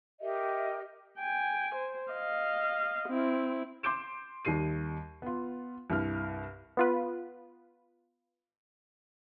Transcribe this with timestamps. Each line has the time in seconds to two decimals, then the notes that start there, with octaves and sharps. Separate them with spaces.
0.21 G4 A#4 D#5 E5
1.19 G5 G#5
1.75 C5
2.12 D#5 F5
3.08 C4 E4
3.83 C6 D6 G6 D7 E7
4.45 D#2 D#3 G3 C7 D#7
5.22 B3 F4
5.90 C2 G2 F6
6.77 B3 F4 B4